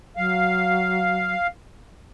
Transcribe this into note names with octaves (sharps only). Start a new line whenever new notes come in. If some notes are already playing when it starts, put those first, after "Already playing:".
F#3 F5